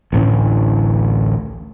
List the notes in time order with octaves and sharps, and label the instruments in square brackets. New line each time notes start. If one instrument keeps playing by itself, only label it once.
[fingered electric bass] A1 D2 A2 C#4